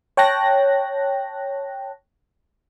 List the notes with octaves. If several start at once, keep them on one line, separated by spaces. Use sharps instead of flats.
C#5 G5 A5 F#6 A#6